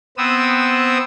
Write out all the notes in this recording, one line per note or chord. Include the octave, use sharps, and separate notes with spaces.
B3 C4 D#6 E6